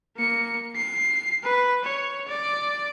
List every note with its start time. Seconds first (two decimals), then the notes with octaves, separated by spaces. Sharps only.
0.17 A#3 C#7
0.76 C7
1.43 B4
1.85 C#5
2.28 D5